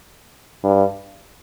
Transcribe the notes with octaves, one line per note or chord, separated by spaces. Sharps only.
G2